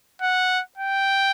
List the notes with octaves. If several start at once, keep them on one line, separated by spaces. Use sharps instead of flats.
F#5
G5